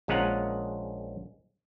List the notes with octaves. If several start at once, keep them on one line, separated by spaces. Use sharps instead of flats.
A#1 G#3 C#4 F4 F#5 A#5